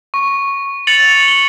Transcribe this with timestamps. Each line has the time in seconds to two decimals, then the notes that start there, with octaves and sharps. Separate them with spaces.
0.14 C#6
0.87 A6 C#7 F7 F#7
1.28 G7